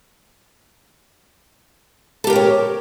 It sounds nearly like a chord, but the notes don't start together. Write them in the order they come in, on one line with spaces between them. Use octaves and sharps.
A4 G4 A#4 G5 C#5